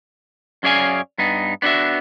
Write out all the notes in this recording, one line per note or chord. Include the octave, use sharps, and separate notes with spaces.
F#2 C#4 G#4 D5 F5 G#5
G2 B3 D#4
B3 D4 E4 F#4 E5